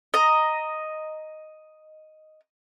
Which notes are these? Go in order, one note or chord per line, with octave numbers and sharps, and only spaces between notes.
D#5 A#5